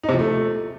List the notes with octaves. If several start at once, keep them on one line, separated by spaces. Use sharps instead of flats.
D#4
C3
F3
A3